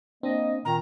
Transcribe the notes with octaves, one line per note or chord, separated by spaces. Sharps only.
A#3 C4 D4 D#5
A#2 D#3 A#5